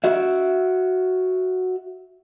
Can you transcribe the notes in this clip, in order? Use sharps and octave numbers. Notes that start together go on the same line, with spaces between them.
F#4 E5